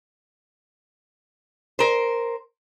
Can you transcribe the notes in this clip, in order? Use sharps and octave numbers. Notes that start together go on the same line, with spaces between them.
A#4 C5